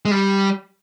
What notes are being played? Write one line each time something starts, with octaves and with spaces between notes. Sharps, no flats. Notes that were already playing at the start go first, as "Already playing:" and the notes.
G#3
G3